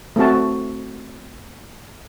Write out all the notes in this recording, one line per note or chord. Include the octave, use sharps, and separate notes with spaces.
A3 C4 F#4 A5